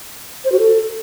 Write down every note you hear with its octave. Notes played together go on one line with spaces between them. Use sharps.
C5
F#4
A4